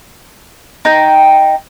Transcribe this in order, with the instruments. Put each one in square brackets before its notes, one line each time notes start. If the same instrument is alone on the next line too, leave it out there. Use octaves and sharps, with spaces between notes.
[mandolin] D#4 G5